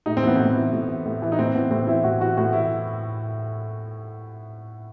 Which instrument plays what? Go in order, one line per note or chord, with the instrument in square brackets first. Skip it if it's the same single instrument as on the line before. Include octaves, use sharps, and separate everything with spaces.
[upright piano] A2 D#4
C4
E3 B3
A2 C4
E3
A2
E3
A2
E3
D#4
A2 C4
E3 B3
A2 C4
E3 E4
A2 F#4
E3 F#4
A2 F#4
E3 E4